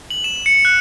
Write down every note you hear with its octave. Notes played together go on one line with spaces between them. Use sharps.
F#7
E7
C#7
F#6